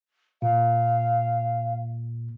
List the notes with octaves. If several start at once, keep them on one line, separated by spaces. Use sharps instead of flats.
A#2 F5